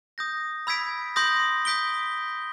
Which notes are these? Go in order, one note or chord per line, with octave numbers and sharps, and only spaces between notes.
D#6 G6 A#6
B5 E6 G#6 B6 D7
C6 D#6 G6 A#6
D#6 G6 B6 D7 G7